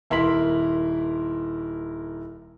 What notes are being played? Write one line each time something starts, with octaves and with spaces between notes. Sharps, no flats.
D#1 E4 A#4 C6 B6 F#7